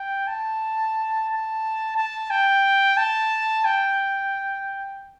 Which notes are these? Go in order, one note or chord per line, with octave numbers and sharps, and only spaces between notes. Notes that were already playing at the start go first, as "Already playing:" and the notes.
Already playing: G5
A5
A5
A5
G5
A5
G5